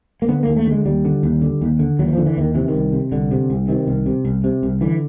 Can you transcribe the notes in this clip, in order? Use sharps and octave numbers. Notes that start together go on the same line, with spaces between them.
A#3
D3 B3
D#2 A#3
A3
D3 G#3
D#2 G3
D3
D#2
D3
D#2
D3
D#2 F#3
E3
D3 F3
E3
D#2 D#3
C3 E3
D#3
C2
C3
C2 D3
C3
C2
C3 D#3
C2
C3
C2
C3
C2
D3 E3